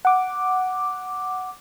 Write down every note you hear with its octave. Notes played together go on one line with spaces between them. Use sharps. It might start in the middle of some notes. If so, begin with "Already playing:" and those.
F#5 D6